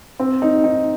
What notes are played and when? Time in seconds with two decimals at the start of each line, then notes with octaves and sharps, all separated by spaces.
0.19 C4
0.42 D#4
0.64 D#4